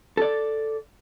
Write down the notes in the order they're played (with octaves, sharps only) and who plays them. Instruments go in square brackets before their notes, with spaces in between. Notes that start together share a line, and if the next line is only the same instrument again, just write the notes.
[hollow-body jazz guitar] A4 D5